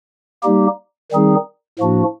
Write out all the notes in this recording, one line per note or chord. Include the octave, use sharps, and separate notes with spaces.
G3 A#3 D#4 G4
D#3 G3 C4 D#4 G#4
A2 F3 A#3 D4 F#4